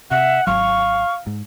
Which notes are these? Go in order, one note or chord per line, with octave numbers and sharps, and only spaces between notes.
C3 E5 F#5
G#1 F#3 F5 C#6
G#2